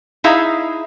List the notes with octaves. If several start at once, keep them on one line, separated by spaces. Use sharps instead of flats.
D#4 E4 G#4 E5 F5 A#5